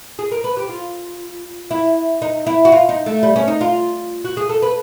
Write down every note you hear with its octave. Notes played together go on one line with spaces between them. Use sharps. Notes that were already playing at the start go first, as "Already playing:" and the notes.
G#4
A#4
B4
G4
F4
E4
D#4
E4
F#4
F4
D#4
A3
G3
C#4
D#4
F4
F#4
G#4
A4
B4